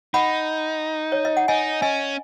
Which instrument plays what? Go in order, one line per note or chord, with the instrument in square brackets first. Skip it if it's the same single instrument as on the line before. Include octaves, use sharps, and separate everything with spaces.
[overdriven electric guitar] D#4 [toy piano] F#5 B5
[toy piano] C#5
D#5
F#5
[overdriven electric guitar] D#4 [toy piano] D#5 G#5
[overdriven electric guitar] C#4 [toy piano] D#5 G#5